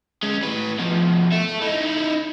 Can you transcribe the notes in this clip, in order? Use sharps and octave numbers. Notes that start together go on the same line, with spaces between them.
G#3 C#4
A2 B4
B2 F3
A4 E5
D#4 E4